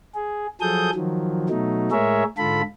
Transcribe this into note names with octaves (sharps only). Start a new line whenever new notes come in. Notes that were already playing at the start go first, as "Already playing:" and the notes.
G#4
F3 F#3 G#4 A4 D#6 G6
D#3 F3 F#3
B2 F#3 A3 D#4
A2 G#3 G#4 A#4 C#5 E5
G#2 D3 F4 A4 B5